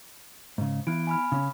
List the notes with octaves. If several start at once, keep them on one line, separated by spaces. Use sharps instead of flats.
G#2 C#3
E3 B3 D7
G#5 B5 F6
C#3 C#4